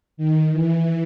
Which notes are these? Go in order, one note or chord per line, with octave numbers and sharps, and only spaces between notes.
D#3
E3